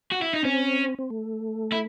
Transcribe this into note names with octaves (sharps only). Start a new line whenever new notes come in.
F#4
E4
D#4
C4 C#4
C4
A3
E4